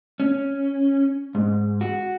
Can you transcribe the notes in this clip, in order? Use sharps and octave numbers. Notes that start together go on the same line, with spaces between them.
C#4
G#2
F#4